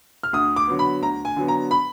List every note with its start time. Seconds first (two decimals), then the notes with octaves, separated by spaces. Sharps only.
0.23 F6
0.33 D2 D#6
0.56 D6
0.67 D3 F#3 B3
0.79 B5
1.02 D2 A#5
1.25 G#5
1.36 D3 F#3 B3
1.48 A#5
1.71 B5